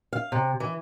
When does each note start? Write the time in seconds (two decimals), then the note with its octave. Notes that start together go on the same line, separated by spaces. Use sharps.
0.13 F5
0.32 C3
0.60 E3